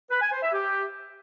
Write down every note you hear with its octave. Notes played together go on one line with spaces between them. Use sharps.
B4
G#5
C5
E5
G4